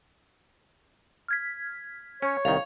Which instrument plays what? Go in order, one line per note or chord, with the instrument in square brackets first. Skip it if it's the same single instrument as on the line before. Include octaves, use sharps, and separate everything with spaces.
[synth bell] F6 G#6 B6
[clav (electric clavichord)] C#4 [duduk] C#5
[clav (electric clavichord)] C2 D#3 [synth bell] F5